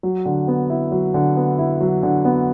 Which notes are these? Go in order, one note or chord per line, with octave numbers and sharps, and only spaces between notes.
F#3
D3
B3
E4
F#3
D3
B3
E4
F#3
D3
B3